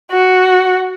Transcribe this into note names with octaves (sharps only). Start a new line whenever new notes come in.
F#4